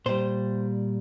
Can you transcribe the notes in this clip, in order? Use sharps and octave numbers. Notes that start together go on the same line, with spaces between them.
A#2 G3 C5